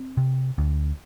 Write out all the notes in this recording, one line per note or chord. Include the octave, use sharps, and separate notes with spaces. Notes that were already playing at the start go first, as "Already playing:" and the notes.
Already playing: C4
C3
D2